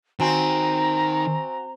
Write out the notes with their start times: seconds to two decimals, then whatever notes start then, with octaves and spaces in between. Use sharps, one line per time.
0.20 D#3 C4 F#4 G#5 A#5